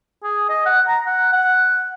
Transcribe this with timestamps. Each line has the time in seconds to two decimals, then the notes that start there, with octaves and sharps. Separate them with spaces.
0.23 G#4
0.49 D#5
0.66 F#5
0.87 A#5
1.06 F#5
1.32 F#5